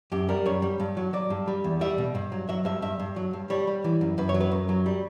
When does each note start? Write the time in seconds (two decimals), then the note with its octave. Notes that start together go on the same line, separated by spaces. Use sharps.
0.12 F#2 G4
0.29 G3 A#4
0.46 F#2 C#5
0.62 G3
0.80 G2
0.97 F#3
1.13 F#3 D5
1.30 G2
1.48 G3
1.64 E2
1.81 G3 E5
1.98 B2
2.15 G2
2.32 F#3
2.49 F#3 E5
2.65 G2 E5
2.82 G2 E5
3.00 G2
3.16 F#3
3.33 G2
3.50 G3 C#5
3.67 G3
3.84 E3
4.01 F#2
4.18 F#2 B4
4.29 C#5
4.34 F#3
4.40 B4
4.52 F#2
4.69 F#3
4.86 G3